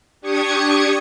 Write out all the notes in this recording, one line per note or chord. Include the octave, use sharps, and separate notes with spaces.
D4 G4 C#6 D#6 G#6 C#7